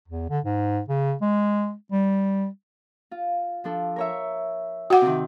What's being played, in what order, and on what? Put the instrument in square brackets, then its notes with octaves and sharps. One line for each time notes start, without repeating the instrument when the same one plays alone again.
[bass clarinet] E2
D3
G#2
C#3
G#3
G3
[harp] F4
F3 D4 A4
A#4 C#5 E5
[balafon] F#4 F#5 [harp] G5 D6
[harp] C3 D#3